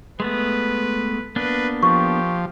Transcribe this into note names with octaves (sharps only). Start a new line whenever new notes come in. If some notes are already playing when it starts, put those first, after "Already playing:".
G#3 A3 B3 B4
A#3 B3 D4 B4
F3 G4 C#6